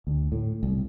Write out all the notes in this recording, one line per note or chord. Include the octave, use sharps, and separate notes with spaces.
D2
A2
C2